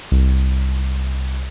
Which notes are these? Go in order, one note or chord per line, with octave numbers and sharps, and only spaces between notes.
C2